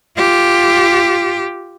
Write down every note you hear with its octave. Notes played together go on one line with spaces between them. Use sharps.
F4 G4